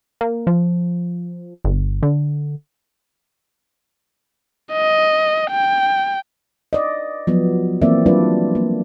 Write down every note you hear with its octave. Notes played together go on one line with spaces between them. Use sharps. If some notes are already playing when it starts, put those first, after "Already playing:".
A#3
F3
G1
D3
D#5
G5
D5 D#5
F3 F#3 B3
E3 A#3 C4 D5 E5
F#3 G3 D4 F4 B4 D5
A#3